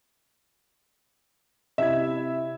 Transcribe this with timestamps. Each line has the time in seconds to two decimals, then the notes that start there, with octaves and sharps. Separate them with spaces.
1.78 C3 E4 E5 G#6